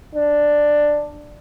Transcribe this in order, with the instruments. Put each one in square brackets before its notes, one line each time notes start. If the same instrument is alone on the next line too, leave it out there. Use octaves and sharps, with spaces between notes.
[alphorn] D4